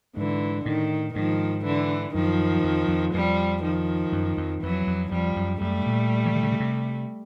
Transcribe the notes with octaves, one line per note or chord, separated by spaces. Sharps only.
G#2 D3 E3
A2 D#3
G#2 D#3 F3
D3 E3
F#2 D#3 F3
F2
F2
F2 F3 G3
D#3 F3
F#2
F2
F2 E3 F#3
F2
F2 F3 G3
F#2
F#2 G3 A3
A#2
E3
D#3
D3
C#3
C3